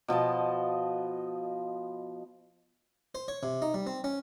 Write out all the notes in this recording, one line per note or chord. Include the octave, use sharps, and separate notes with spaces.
B2 F3 D#5 A5
C5
C#5
C3
D#4
G3
C4
C#4